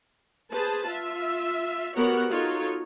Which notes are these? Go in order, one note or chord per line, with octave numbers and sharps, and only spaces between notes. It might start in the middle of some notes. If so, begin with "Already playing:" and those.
G#4 B4 C5 A5
F4 E5
B3 F#4 G4 A#4 C#5 F#5
D#4 F4 F#4 A4 C#5